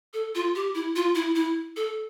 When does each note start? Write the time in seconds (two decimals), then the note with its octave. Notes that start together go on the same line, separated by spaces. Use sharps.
0.14 A4
0.35 F4
0.55 G4
0.75 E4
0.96 F4
1.15 E4
1.36 E4
1.76 A4